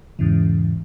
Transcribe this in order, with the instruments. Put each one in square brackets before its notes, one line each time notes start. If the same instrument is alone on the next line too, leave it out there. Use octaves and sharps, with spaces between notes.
[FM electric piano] E2 G#2 C#3 E3